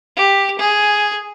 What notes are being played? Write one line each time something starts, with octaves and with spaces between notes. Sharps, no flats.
G4
G#4